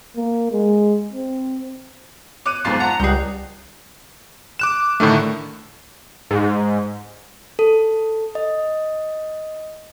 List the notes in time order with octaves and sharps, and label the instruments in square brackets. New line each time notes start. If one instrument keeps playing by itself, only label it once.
[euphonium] A#3
G#3
C4
[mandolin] C#5 [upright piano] D6 F#6 D#7
[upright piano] B1 F2 G#2 [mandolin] D4 F4
[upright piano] F#5 [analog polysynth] A#5
[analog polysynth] C#2 [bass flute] G3 [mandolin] G#4 G6
[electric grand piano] D6 F#6 E7
A2 D3 D#3 A3
[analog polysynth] G#2
[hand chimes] A4
D#5